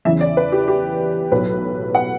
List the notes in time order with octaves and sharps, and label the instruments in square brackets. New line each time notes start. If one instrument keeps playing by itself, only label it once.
[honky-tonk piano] E2 C#3 E3 E5
D5
B4
G4
G4
B1 A2 F#3 B4
F#5